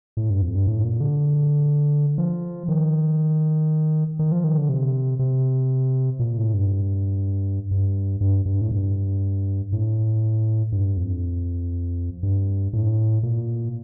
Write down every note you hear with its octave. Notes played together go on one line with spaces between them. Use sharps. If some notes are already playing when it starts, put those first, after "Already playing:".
A2
G2
F2
G2
A2
A#2
D3
F3
D#3
D#3
F3
D#3
D3
C3
C3
A#2
A2
G2
G2
G2
G2
A2
G2
A2
G2
F2
G2
A2
A#2